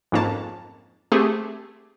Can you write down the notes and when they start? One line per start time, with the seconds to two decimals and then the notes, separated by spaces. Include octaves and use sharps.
0.12 F2 G#2 A#3 C#4 A5
1.12 A3 C4 G4 G#4